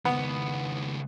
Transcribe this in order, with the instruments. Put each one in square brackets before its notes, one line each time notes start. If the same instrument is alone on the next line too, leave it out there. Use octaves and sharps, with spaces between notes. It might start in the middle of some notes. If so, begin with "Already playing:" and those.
[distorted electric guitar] C#2 D#3 [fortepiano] B3